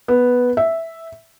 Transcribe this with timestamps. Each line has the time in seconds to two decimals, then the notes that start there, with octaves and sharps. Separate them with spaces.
0.08 B3
0.57 E5